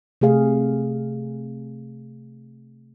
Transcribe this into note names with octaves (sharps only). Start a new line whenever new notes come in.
C3 A3 G#4 F5